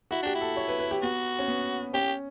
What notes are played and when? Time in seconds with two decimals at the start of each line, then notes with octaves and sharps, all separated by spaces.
0.11 E4 F#4
0.23 D4 G4
0.35 E4
0.41 A4
0.57 C#5
0.68 B4
0.79 B4
0.91 G4
1.02 B3 F#4
1.39 C#4
1.48 B3
1.93 C#4 G4